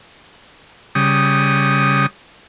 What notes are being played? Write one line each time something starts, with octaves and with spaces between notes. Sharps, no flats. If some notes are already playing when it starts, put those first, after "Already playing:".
C#3 G3 D#6